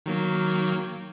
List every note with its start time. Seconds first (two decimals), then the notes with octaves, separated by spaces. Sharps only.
0.06 D#3 F#3 A#3